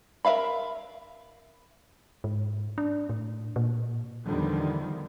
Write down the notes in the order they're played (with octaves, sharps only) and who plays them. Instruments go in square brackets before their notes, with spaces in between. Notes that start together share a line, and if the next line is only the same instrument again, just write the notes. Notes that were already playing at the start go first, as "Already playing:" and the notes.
[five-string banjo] A#4 B4 E5 F5 B5
[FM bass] G#2
D4
A2
A#2
[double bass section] E2 D3 D#3 F3 G3